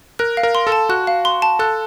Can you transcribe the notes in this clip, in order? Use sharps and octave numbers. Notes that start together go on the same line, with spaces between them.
A#4 F#6
F5
A#4
C6
A4
A5
F#4 F#6
F5
C6
A5
A4 F#6